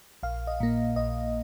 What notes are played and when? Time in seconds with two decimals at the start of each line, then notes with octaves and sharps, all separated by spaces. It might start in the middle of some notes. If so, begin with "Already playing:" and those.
0.23 A#1 F5
0.47 D#5
0.60 A#2 A#3
0.96 A#1 D#5